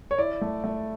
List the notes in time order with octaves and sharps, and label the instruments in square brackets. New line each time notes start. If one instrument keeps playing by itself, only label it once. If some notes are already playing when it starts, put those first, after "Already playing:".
[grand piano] C#5
E4 D5
A3
A3